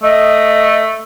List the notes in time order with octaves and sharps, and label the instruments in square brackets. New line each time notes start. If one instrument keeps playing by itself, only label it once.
[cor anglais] A3 [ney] D#5